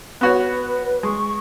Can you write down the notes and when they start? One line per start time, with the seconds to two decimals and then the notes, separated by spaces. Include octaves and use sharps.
0.21 B3 F#4 B4 C#5
1.03 G#3 C#6